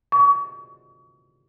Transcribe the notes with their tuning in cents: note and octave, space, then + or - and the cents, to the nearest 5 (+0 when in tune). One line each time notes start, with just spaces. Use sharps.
C#6 +35